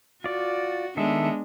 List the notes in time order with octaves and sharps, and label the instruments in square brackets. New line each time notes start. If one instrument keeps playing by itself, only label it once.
[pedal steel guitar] F4 D5 [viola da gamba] F#4
[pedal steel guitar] D#3 A4 E5 [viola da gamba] G#3 B3 D4